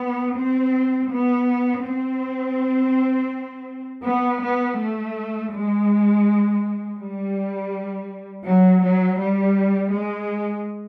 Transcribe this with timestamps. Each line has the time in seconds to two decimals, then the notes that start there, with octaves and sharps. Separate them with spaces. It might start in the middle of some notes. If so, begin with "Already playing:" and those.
Already playing: B3
0.35 C4
1.10 B3
1.83 C4
4.03 B3
4.41 B3
4.77 A3
5.51 G#3
6.98 G3
8.45 F#3
8.83 F#3
9.19 G3
9.92 G#3